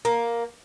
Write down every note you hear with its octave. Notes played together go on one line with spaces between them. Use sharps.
A#3